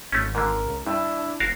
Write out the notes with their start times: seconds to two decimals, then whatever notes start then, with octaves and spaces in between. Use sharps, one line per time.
0.12 G#1 A3 C#4
0.35 G#2 D3 A#4
0.66 C#2
0.86 G2 D4 E4
1.40 F#1 F#4 A#4 F5